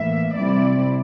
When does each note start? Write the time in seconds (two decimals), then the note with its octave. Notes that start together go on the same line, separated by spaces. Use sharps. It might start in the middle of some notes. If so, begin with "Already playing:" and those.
Already playing: A2 E3 A#3 E5
0.36 C3 G3 C4 E4 D5